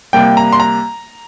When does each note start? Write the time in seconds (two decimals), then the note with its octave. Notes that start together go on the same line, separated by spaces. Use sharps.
0.13 C3 G3 A#3 G5
0.37 A#5
0.53 C6
0.60 A#5